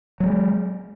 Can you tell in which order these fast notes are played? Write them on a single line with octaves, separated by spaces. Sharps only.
F#3 A3 G#3